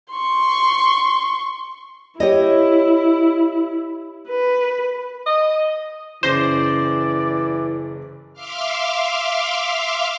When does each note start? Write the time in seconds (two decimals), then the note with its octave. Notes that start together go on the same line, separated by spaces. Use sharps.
0.12 C6 C#6
2.20 E4 G4 C#5 D#5
4.29 B4
5.26 D#5
6.23 F#1 E3 C#4 C5 D5 A#6
8.33 E5 F5 C6 D6 F6